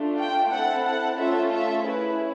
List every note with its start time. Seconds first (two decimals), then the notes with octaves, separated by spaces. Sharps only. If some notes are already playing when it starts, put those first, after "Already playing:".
Already playing: A3 D4 F4
0.18 G5
0.51 C4 E4 A4 F#5
0.84 F#5
1.18 A3 C#4 F4 A4 E5
1.52 E5
1.85 C#4 E4 G#4 B4